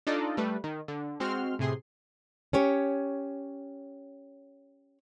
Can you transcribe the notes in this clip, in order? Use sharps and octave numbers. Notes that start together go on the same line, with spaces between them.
D4 D#4 F4 A4 D5 D#5
G3 A3 B4
D#3
D3
G#3 C4 F#4 C6 F6
A2 C3 G#4 C6
C#4 G4 C#5